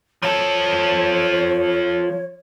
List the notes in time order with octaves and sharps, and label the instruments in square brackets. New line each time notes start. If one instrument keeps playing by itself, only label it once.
[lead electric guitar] F3 A4 [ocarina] C#5